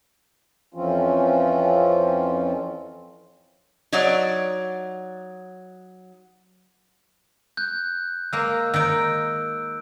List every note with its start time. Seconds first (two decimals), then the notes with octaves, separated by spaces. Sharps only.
0.74 F2 E3 F3 C4 C#4 F4
3.92 F#3 D#4 C#5 D5 F#5
7.57 F#6 G6
8.33 G#3 A#3 E6 G6
8.74 D#3 D#4 E6 D7